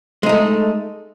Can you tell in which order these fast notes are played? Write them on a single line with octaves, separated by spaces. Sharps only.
G#3 D#4 A3